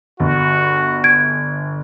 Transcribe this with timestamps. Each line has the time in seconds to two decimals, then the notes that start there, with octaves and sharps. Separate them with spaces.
0.20 G1 F#4
1.04 G#6 D7